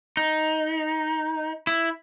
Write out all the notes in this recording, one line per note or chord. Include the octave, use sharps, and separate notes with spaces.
D#4
E4